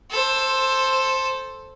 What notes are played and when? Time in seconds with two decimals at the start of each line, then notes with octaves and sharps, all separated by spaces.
0.10 A4 C5